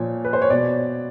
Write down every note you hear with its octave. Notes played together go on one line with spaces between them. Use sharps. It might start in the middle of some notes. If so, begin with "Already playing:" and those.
Already playing: A#2 F3 C#5
B4
C5
C#5
B2 D5